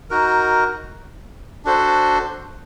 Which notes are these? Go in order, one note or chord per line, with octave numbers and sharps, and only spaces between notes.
D#4 F#4 A#4
D4 F#4 A4 C5